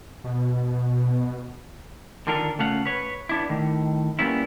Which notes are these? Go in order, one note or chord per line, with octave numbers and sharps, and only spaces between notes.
B2
D3 D#3 D4 F4 A4 A#4
C#3 A3 F4 F5 F#5
B4 C#5
B3 D4 E4
A2 D#3
G3 A#3 B3 C#4 E4